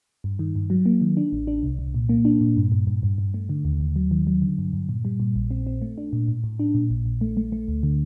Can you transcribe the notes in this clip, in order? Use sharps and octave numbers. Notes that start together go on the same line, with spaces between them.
G2
D#3
G2
F#3
A#3
D#3
D4
A1
D4
C2
C2
A#2
A#3
D4
A#2
G2
G2
G2
G2
G2
A3
D3
D#2
D#2
F#3
D#3
F#3
D3
G2
G2
A#2
G3
A#2
A#1
C4
C4
A3
D4
A#2
A2
A2
D4
A#2
A#1
A#1
A3
A3
A3
D2
D3